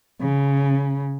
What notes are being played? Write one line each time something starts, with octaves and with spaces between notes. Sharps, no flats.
C#3